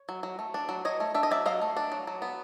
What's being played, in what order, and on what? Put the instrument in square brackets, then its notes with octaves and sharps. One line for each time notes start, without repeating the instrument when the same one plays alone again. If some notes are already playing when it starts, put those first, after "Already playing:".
Already playing: [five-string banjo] C#5
F#3
F#3
A3
D4
F#3
F#3 C#5 D#5
A3
D4 E5
D#5
F#3 D5 E5
F#3 D#5 F5
A3
D4
F#3
F#3
B3